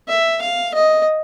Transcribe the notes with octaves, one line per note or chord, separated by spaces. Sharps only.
E5
F5
D#5